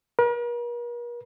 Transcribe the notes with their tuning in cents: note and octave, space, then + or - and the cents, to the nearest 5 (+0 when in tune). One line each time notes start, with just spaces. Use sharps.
A#4 +45